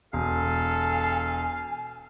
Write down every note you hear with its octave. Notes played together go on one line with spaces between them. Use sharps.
E1 A4 F5 G#5